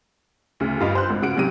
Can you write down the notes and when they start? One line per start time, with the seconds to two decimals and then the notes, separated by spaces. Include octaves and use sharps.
0.60 D2 C#3
0.80 G2 F4 D#5
0.95 C5 F#6
1.10 G#1
1.22 C#3 F#4 D7
1.36 G#2 C3 F#3 G4 D#7